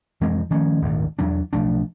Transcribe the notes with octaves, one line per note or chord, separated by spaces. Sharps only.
F2 E3 G#3 C4
D#3 F3 A3 C#4
D#1 G#1 D2
E2 F#3 D4
B1 F3 A3 D4